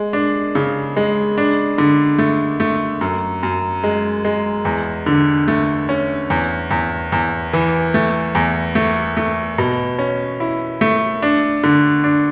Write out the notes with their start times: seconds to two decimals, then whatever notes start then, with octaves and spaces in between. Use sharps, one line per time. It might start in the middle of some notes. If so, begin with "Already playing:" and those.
Already playing: G#3
0.13 D4
0.55 C#3
0.97 G#3
1.38 D4
1.78 D3
2.18 A3
2.60 A3
3.01 F#2
3.43 F#2
3.84 G#3
4.25 G#3
4.65 E2
5.06 D3
5.48 A3
5.89 C#4
6.30 E2
6.71 E2
7.12 E2
7.53 E3
7.94 A3
8.35 E2
8.75 A3
9.17 A3
9.58 B2
9.99 C#4
10.40 E4
10.81 A3
11.22 D4
11.64 D3
12.04 D4